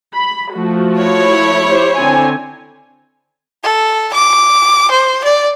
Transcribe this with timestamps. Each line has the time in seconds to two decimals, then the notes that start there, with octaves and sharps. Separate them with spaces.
0.13 B5
0.54 F3 A3 F#4
0.99 E4 C#5
1.69 G4 C5
1.97 D3 C4 G#5
3.63 A4
4.13 D6
4.91 C5
5.24 D5